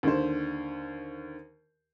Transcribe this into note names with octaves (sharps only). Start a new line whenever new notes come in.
D#2 D3 C5